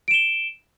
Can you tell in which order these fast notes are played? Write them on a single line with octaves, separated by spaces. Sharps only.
D7 E7 G7